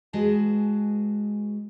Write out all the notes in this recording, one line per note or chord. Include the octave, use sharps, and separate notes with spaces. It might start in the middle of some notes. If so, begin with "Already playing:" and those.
G#3 F#4 G#4 B4 A5